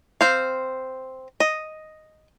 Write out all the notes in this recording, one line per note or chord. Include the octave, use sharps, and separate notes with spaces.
C4 C5 F5
D#5